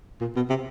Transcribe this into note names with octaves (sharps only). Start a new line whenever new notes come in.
A#2
B2
C3